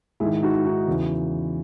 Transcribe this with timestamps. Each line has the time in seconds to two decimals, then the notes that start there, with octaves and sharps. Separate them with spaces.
0.20 G#2 D#3 E4 G#4
0.42 D#4 F#4
0.65 D#4 F#4
0.87 E2 C#3 E3